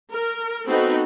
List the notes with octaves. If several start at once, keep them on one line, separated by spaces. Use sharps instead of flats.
A#4
B3 C4 D#4 F#4 A4 B4